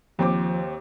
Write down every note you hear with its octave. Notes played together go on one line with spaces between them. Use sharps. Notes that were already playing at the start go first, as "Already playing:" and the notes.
D#2 F3 C4 D6